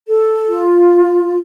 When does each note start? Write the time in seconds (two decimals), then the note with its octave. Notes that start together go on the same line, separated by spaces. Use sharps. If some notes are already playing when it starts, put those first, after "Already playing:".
0.08 A4
0.47 F4